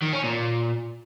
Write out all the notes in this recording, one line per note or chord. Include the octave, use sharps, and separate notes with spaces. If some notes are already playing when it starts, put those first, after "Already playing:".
D#3
C#4
A#2